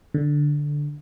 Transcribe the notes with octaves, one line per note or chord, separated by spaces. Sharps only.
D3